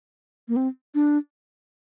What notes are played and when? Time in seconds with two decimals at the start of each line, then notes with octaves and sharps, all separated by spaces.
0.48 A#3
0.56 C4
0.95 D4